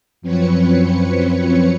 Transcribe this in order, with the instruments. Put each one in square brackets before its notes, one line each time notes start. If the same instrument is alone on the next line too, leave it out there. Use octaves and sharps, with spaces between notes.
[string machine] F#2 F3 C4 B4 C#5 C#7